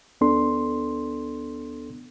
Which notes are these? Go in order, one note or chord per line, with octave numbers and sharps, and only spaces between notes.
D2 B3 D4 A4 C6